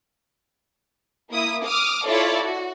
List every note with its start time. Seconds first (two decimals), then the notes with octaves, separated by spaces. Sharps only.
1.29 A#3 E4 D#6
1.63 D6 D#6 F6
2.07 E4 F4 A4 C#5 D5
2.40 F#4